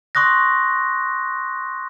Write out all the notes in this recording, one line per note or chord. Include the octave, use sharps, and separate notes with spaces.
C6 C#6 D#6 F#6 A#6